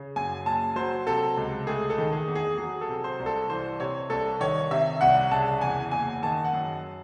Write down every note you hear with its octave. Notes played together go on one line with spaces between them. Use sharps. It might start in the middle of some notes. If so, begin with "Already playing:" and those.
Already playing: C#3
F#2 G#5
F#1 A5
F#3 C5
C3 A4
C#2
A3 G#4
A4
D#3
G#4
E2
G#4
F#3 G#4
A4
C3
C5
C2
A4
E3 C5
C3 C#5
C2 A4
D#3 C#5
C3 E5
C2 F#5
C#3 A5
E2 G#5
F#1 G#5
D#3 A5
F#5
F#2